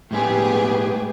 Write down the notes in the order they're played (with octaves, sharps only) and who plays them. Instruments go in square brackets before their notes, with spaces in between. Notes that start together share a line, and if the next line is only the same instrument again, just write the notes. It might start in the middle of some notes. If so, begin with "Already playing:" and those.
[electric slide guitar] A2 G#3 B4 [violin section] B3 G4 G#4